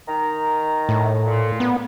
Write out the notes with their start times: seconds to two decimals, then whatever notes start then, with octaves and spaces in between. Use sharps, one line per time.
0.08 D#3 A#5
0.89 A2
1.25 A#2
1.60 B3